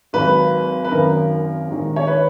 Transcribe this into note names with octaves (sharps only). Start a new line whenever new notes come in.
G#1 G#2 F#3 B4
B4
G#1 F#2 D#3 A#4
A#1 G#2 D#3
C#5
B4